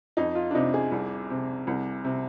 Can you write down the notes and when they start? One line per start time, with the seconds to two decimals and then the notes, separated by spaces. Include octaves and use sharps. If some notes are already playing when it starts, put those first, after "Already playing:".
0.17 F2 D#4
0.35 F4
0.51 D4
0.55 C3 D#4
0.74 G#4
0.92 C2
1.30 C3
1.67 C2
2.04 C3